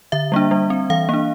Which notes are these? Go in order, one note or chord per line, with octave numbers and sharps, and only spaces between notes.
D3 E5
G3 A#3 D4
G3
C4
E3 F5
A#3 D4